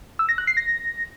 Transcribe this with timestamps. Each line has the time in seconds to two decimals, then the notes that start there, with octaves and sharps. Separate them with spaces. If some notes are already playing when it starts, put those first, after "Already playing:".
0.19 E6
0.29 A#6
0.38 F#6
0.47 C7
0.57 A#6